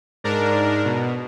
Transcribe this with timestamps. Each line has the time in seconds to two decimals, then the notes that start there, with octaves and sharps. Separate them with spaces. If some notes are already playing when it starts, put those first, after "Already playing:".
0.24 G#2 D4 A#4
0.85 B2